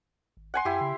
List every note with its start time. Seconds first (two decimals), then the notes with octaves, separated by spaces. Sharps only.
0.37 G#1
0.54 F#5 G#5 C6
0.65 F#2 E4 G4
0.81 C#3